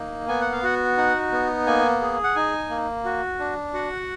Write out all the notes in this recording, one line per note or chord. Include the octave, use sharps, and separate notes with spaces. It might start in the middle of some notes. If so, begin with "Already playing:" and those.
Already playing: A#3 D#4
B3 G#5
F#5
F5
F#4 F#5
D#4 F#5
B3
A#3 G#5
G#4
F#5
D#4 G#5
A#3
F#4
D4
F#4 F#5